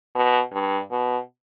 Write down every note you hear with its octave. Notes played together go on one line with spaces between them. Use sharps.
B2
G2
B2